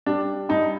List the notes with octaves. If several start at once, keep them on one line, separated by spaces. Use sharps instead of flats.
G3 D4
G2 D#4